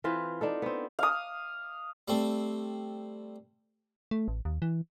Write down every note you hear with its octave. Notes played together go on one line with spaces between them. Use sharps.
E3 C4 F4 B4
D4 D#4 A4
B3 C4
F5 D#6
G3 A3 C4
A3
A1
D#2
E3